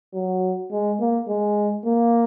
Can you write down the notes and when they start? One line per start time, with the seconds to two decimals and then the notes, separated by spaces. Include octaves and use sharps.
0.14 F#3
0.71 G#3
1.00 A#3
1.28 G#3
1.86 A#3